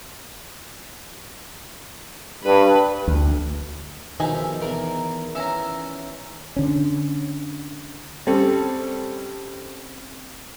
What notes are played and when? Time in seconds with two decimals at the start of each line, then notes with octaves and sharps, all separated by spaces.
2.44 G2 B4
3.08 D2
4.20 B2 D#3 F3 D#4 G#4 E5 G#5
4.62 E2 E3 A#4
5.35 E2 C#4 E5 A#5
6.56 D3 C#4
8.27 G3 C4 C#4 A4